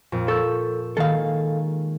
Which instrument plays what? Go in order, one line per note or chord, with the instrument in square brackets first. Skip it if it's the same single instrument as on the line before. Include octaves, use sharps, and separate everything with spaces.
[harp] F2 A#2
[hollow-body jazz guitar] A4 [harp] C#6 E6 G6
[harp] D#3 G#3 A#3 [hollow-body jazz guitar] A4 F5